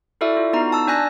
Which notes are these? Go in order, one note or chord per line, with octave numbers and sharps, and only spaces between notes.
E4 F#4 A4 D5 E5
F4
B3 D#4 F#4 A#5
A5 E6
D4 D5 G#5 F#6 A#6